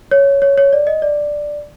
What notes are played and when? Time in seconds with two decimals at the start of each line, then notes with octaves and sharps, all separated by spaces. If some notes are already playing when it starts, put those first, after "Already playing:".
0.11 C#5
0.42 C#5
0.58 C#5
0.73 D5
0.87 D#5
1.02 D5